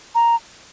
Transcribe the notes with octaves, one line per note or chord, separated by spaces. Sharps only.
A#5